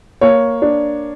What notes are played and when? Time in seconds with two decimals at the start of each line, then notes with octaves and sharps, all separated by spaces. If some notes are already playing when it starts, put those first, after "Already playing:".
0.21 A#3 C#5
0.62 D4